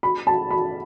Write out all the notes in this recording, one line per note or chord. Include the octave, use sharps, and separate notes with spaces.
B5
A5
B5